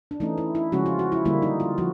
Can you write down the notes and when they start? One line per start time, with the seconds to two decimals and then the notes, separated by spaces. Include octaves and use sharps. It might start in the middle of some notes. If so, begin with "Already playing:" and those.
0.11 D4
0.20 E3 A3 C#4 D#4
0.37 E4
0.55 E4
0.72 C#3 F3 G#3 C#4 F#4
0.86 F4
0.99 F#4
1.12 E4
1.25 D3 G3 A#3 E4
1.42 D#4
1.60 F4
1.78 F3 F#4